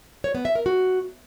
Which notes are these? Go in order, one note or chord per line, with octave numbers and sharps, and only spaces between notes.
C#5
B3
E5
A#4
F#4